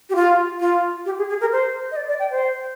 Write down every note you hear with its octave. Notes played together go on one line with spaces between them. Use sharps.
G4
F4
F4
G4
G#4
G#4
A#4
C5
D#5
D5
D5
G5
C5